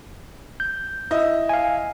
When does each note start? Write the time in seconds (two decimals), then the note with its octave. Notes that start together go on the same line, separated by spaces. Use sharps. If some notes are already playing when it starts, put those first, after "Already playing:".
0.60 G6
1.11 E4 D#5
1.49 F5 G#5